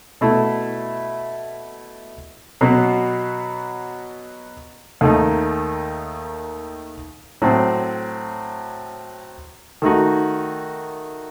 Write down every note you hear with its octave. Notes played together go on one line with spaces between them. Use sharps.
B2 A3 E4
B2 F#3 B3
D#2 D#3 A3 D#4
A2 F#3 C4
D#3 A3 D#4 F#4